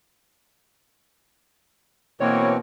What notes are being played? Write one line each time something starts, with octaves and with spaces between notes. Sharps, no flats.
B2 E3 A#3 C4 C#5